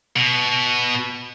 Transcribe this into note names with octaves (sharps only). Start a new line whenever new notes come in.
B2